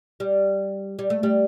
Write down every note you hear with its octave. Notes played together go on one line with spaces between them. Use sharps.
G3
G3
A3
G3